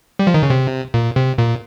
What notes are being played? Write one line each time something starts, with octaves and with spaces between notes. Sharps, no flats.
G3
F3
D#3
C#3
C3
A#2
C3
A#2